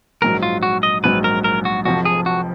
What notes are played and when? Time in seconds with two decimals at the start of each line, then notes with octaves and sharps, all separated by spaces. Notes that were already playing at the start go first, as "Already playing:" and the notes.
0.22 A#1 G#2 F#3 A#4
0.43 F4
0.63 F#4
0.83 D#5
1.04 A#1 G#2 F#3 B4
1.24 A#4
1.44 A#4
1.65 F#4
1.85 F1 F2 F3 F#4
2.05 G#4
2.26 F#4